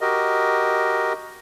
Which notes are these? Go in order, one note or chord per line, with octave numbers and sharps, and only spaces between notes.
F#4 G4 A#4 D#5